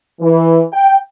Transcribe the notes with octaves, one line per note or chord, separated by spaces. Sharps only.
E3
G5